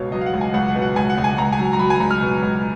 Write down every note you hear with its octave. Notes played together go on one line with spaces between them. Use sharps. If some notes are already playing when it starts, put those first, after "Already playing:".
Already playing: C#2 B2 C#5 F5
F#3 D#5
F5
F#5
C#2
G#5
C#2 F#5
F#5
B2
F#5
C#2 G#5
F#5
C#2
G#5
C#2 A#5
G#5
F#3
A#5
F#3 B5
G#5
C#2 A#5
F6
B2
C#2